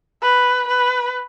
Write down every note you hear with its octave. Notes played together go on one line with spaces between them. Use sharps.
B4
B4